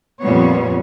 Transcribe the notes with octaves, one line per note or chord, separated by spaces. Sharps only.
F2 A#2 G3 B3 C#5